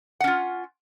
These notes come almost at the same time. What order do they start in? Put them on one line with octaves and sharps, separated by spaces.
F#5 C#4 F4